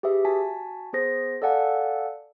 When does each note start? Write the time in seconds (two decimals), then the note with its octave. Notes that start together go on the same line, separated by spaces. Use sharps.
0.03 G4 G#4 B4 E5
0.25 F#4 G#5 A5 B6
0.93 B3 G#4 C5 A#6
1.42 A4 D5 F5 F#5 G#5 A5